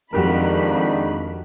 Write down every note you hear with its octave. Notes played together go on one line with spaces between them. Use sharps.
F2 D#3 G#3 D4 F#4 G4 A#4 B5